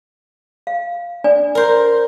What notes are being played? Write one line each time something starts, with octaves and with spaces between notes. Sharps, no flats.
F5
D4 D5 G#5
A#4 C5